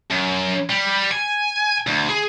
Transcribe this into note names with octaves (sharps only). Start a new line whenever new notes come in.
F#2
G3
G#5
D2
G#4